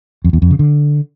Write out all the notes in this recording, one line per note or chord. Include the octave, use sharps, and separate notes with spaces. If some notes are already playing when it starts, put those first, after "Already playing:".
F2
E2
F2
C#3
D3